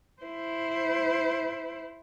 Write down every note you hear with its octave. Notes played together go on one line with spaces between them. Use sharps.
E4 C5